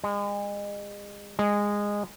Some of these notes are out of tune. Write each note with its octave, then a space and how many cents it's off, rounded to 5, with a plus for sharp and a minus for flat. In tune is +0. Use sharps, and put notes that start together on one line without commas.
G#3 -35
G#3 -15